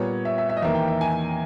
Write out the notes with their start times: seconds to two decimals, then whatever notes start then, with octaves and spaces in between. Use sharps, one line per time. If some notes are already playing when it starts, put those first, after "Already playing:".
Already playing: A#2 G3 B3 C#5
0.25 E5
0.38 E5
0.49 E5
0.57 D#5
0.62 E2 D#3 A#3 E5
0.75 G5
0.88 E5
1.01 G#5